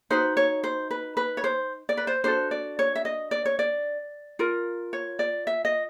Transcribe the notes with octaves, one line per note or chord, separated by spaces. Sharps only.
D#4 F#4 B4 C5
C#5
C5
B4
B4
C#5
C5
D5
B4
C5
D4 F#4 A4 C5
D5
C#5
E5
D#5
D5
C#5
D5
F4 A#4
C#5
D5
E5
D#5